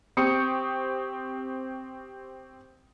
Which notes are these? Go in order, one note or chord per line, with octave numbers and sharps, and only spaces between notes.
C4 G4 C#6 D#6 C#7